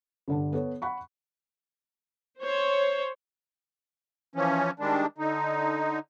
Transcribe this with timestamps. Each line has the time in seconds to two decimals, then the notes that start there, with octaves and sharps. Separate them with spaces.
0.28 G1 D3 D4
0.53 B3 A4 C#5
0.82 F#5 B5 C#6
2.41 C5 C#5
4.35 E3 F3 C#4
4.80 D#3 G3 G#3 D4
5.18 D3 D#4